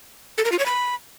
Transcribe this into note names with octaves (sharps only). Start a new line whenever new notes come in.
A4
A#4
F4
C#5
B5